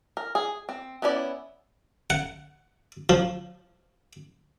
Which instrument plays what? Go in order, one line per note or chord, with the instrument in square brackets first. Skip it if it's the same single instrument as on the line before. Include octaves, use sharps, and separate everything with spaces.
[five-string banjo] A#4
G#4
C4
B3 C#4 E4 A#4 D5
[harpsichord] F#5
F3